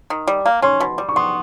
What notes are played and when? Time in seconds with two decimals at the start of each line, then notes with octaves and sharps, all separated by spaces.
0.10 D#3
0.27 G3
0.46 A#3
0.62 C#4 C6
0.80 B2
0.98 G3
1.09 C#6
1.16 B3 C6